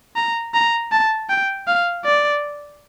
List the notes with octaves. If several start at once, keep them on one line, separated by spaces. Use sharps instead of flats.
A#5
A#5
A5
G5
F5
D5